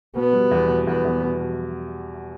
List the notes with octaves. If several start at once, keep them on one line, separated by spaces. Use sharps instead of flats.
B2 B3
G3
E2
B2
E2 B3
E2
B2
B2